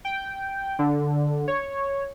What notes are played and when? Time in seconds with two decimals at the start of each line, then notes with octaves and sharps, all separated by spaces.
0.05 G5
0.79 D3
1.48 C#5